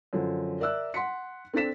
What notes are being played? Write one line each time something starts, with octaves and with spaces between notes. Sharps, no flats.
F#2 D3 F3
A#4 D5 E5 E6 F#6
F#5 C6 B6 C#7
C4 D4 A4 A6 B6 E7